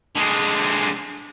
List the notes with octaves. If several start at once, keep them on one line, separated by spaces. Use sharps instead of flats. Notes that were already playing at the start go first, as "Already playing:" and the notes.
D3 G#3